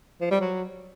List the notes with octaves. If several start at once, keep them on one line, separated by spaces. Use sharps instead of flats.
F3
G3
F#3